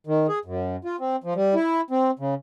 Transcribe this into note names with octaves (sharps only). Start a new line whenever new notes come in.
D#3
G#4
F#2
F4
C4
F3
G3
E4
C4
C#3